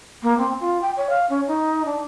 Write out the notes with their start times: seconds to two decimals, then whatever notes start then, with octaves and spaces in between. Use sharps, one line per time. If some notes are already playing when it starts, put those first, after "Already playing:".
0.23 A#3
0.38 C4
0.60 F4
0.82 G5
0.97 C#5
1.10 F5
1.29 C#4
1.47 D#4
1.85 D4